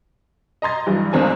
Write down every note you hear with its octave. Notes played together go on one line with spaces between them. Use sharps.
D#5 A#5 C6 A6
G2 E3 F#3 G3
G1 C#2 D3 C4 A#4 G#5